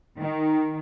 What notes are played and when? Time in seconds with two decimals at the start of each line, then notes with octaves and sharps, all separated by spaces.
0.18 D#3